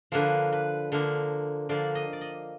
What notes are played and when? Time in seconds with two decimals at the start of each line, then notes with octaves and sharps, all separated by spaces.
0.12 D3 F3 A#3 B4
0.53 B4
0.92 D3 F3 A#3
1.69 D3 F3 A#3 D5
1.95 D#5
2.13 D5
2.21 D#5